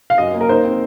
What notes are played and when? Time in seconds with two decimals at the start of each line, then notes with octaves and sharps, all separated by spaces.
0.10 F5
0.18 F#2 D#5
0.34 A#3
0.41 A#4
0.49 D#4 C5
0.64 C4